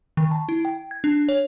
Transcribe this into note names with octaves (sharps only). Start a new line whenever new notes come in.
D#3
A5
E4
G5
G#6
D4
C#5